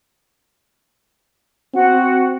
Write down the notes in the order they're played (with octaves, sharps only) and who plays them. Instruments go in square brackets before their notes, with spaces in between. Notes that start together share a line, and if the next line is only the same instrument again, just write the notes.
[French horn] C4 [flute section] F#4 F#5